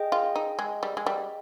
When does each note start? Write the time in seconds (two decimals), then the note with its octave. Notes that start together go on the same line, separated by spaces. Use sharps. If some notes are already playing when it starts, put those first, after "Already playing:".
Already playing: G#4 D#5 G5
0.12 F4
0.36 D#4
0.59 G#3
0.83 G3
0.97 G#3
1.06 G3